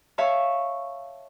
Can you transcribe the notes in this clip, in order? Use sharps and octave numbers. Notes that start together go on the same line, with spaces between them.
C#5 E5 F5 A5 C#6